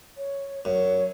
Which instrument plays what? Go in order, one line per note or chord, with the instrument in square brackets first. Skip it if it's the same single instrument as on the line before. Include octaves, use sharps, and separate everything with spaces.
[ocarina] C#5
[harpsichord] F#2 [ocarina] C#5